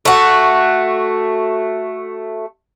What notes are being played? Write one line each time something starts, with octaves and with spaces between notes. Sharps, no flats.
A3 F#4